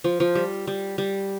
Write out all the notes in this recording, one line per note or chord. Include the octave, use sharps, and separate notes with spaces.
F3
F3
G3
G3
G3